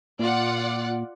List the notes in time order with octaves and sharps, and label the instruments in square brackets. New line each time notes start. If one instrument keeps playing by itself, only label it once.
[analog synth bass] A#2 [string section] F4 D5 F#5